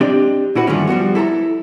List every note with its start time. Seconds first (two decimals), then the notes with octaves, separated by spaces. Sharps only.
0.01 C4 D4 G4 D5 D#5
0.55 A#2 E4 F#4 B4
0.67 G2 D3 D#3 F3 A3 C#4
0.87 F3 G3 B3 F#4
1.15 E4 A4 C5 A#5